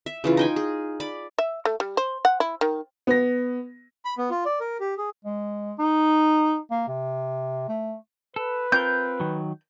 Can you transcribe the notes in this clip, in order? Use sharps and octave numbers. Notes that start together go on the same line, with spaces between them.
E5
C#3 E3 F4
D#4 G5 G#5
G#4
D5 B5
E5
A3
G3
C5
F#5
E4
D#3
B3 A#6
B5
B3
F4
D5
A#4
G4
G#4
G#3
D#4
A#3
C3
A3
A4 B4
C4 F4 A#4 G6
D#3 F#3